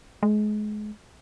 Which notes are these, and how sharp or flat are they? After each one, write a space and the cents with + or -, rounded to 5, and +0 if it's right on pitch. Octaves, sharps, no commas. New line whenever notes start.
G#3 +30